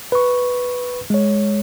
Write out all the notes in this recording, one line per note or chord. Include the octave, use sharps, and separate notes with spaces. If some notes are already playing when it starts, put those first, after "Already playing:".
B4 C#6
G#3 C#5